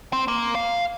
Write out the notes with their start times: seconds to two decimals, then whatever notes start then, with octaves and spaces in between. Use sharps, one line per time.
0.13 C4
0.28 A#3
0.55 F5